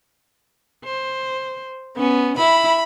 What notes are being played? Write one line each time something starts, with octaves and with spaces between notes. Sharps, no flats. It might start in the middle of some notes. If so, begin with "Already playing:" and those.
C5
B3 C#4
E4 B5